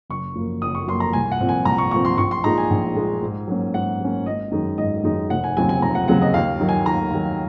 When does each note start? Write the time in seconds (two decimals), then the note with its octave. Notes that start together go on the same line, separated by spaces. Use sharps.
0.10 F#1 C#6
0.35 F#2 F3 A#3
0.62 F#1 D#6
0.75 C#6
0.87 F#2 F3 A#3 C6
1.00 A#5
1.13 C2 G#5
1.32 F#5
1.40 A#2 F3 C4
1.49 G#5
1.65 C2 A#5
1.78 C#6
1.91 A#2 F3 C4 C#6
2.05 C6
2.18 A#1 C#6
2.31 C6
2.44 A#2 G#3 D#4 A#5
2.58 G#5
2.71 A#1
2.95 A#2 G#3 D#4
3.23 G#2
3.48 F#3 A#3 C#4
3.74 G#2 F#5
4.00 F#3 A#3 C#4
4.26 G#1 D#5
4.52 F#2 D#3 G#3 D#4
4.78 G#1 D#5
5.04 F#2 D#3 G#3 D#4
5.30 F1 F#5
5.44 G#5
5.57 D#2 C#3 F#3 C4 G#5
5.69 G#5
5.82 F1 A#5
5.95 F#5
6.08 D#2 C#3 F#3 C4 F#5
6.22 D#5
6.34 D#2 F5
6.60 D#3 F#3
6.69 G#5
6.86 D#2 A#5
7.12 D#3 F#3